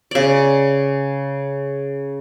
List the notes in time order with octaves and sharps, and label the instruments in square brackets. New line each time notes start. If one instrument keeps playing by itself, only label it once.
[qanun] C#3 D5